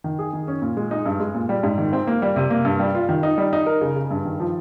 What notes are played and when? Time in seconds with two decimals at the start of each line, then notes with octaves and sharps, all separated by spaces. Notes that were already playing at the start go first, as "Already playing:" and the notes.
0.04 D#3
0.19 G#4
0.33 D#3
0.48 C#4
0.62 A#2
0.77 G#3
0.91 D#4
1.06 G2
1.20 G#3
1.34 A#2
1.49 G3
1.63 G#2
1.78 D#3
1.93 C4
2.07 A#3
2.22 G3
2.36 C3
2.51 A#3
2.65 G2
2.80 G3
2.95 F4
3.09 D#3
3.23 D#4
3.38 G3
3.53 D#4
3.67 A#4
3.81 C#3
3.96 C#3
4.11 G2
4.25 D#3
4.40 F3